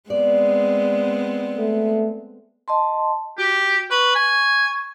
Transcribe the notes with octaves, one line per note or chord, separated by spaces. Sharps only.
G#3 B3 C4 D5
A3
D#5 A5 C6
F#4 G4
B4 C#6
G#5